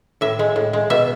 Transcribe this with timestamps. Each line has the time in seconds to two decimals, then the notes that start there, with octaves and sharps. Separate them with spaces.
0.21 A2 E5
0.39 G#3
0.56 A2
0.73 G#3
0.90 B2 E5